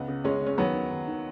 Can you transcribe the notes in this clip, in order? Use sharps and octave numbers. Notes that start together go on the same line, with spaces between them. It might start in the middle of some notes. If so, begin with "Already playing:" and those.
Already playing: C#2 B3
C#3
C#2 G#3 C#4
C#3
C#4
D#2 F#3 B3
D#3
D#2
D#3